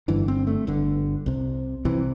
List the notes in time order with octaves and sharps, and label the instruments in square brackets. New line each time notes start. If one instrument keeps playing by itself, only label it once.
[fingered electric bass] G1 G2 D3 E3
C4
A3
G1 G2 D3
C2 C3
C2 C3 E3